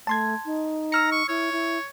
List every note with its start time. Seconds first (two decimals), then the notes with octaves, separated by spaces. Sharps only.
0.07 A3 A5 C6 G#6
0.45 D#4
0.92 A#5 E6 F6 C#7
1.12 C#6
1.28 E4 C#5
1.52 E4